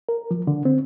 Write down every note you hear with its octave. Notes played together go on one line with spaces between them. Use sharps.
A#4
F3
D3
C4